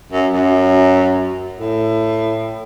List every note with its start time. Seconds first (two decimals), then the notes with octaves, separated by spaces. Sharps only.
0.12 F#2
0.33 F#2
1.59 A2